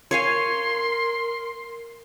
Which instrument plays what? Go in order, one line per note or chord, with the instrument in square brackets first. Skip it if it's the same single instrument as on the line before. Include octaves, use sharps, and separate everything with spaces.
[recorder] A#4 [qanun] C#5 F5 G#5 [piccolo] C6